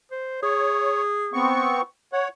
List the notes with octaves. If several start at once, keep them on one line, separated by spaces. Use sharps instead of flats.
C5
G#4 C#5
B3 C4 C#6
C#5 F#5